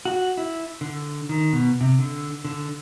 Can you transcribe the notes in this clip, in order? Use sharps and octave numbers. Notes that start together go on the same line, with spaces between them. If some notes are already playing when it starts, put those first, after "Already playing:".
F#4
E4
D3
D#3
B2
C3
D3
D3